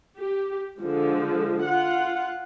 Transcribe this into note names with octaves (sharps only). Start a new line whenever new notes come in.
G4
D3 F3 G#3
F4 F#5